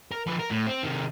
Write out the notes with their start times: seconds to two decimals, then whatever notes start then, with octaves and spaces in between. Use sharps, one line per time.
0.11 A#4
0.27 F3 B4
0.39 A#4
0.51 A2
0.67 C4
0.83 C3 D#3